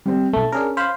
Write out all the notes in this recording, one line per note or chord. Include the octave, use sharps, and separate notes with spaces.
G3 C4
B1 A3 A5
C#4 D4 G#4 A#4
C5 F5 B5